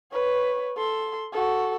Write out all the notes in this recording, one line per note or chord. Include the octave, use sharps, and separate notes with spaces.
B4 C#5
A4 C6
F#4 A4